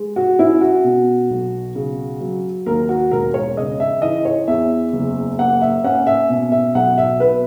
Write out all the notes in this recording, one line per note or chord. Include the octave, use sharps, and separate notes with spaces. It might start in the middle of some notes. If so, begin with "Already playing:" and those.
Already playing: G#3
F#4
C#4 E4
F#4
B2
B1
C#3
F#3
D#2 A#4
F#4
E1 A#4
C#5
C#3 D#5
E5
E3 D#5
C#5
E2 E5
F#1
A#3 F#5
E5
C#4 F#5
E5
B2
E5
B1 F#5
E5
B2 B4